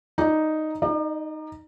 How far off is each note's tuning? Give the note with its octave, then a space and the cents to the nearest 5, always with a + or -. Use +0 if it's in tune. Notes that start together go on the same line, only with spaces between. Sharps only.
D#4 +0 D5 +0
D#4 +0 D5 +45